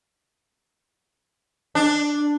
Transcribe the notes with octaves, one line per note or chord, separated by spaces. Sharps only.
D4